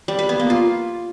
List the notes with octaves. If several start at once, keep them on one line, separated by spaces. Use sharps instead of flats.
G3
B4
B3
A#3
F4